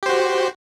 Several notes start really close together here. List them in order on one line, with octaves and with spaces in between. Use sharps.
G4 C5 F#4